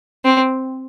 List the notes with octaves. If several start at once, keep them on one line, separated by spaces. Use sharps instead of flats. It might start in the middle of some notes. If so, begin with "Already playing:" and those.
C4